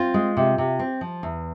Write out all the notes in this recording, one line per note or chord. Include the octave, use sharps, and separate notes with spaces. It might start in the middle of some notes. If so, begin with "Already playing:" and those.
Already playing: C4 F4
G#3
C3
C3
C4
F3
E2